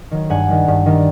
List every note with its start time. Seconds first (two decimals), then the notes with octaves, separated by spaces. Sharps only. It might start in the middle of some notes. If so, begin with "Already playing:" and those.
0.11 D#3 F#3
0.30 G2 F#5 G#5
0.48 D#3 G3
0.68 G2
0.86 D#3 G3